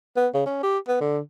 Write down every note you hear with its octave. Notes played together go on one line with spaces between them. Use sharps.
B3
C#3
C#4
G4
B3
D3